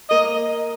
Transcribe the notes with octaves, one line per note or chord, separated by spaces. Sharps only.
A#3 D#5